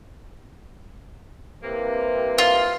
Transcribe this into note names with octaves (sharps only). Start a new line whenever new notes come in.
C2 C3 A#3 B4
F4